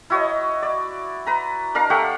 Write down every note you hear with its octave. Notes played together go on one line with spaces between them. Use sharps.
E4 F#4 C#5 D#5
D5
B4 A#5
D4 A#4 F5 A#5
A3 G4 F5 F#5